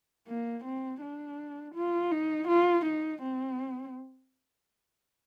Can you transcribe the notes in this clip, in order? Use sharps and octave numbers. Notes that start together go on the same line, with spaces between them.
A#3
C4
D4
F4
D#4
F4
D#4
C4